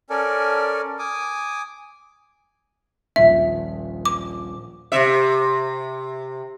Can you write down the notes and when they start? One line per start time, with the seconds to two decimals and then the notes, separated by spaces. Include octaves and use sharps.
0.10 C#4 A4 A#4 D5 G#5
0.99 G#5 D6 D#6
3.16 D#1 A#1 E5
4.05 D6
4.92 C3 E5